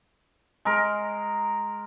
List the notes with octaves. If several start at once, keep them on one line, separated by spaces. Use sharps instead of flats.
G#3 A#4